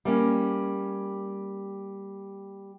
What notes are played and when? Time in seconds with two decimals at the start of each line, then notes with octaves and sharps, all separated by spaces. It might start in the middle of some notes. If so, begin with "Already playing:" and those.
0.05 G3 A#3 C#4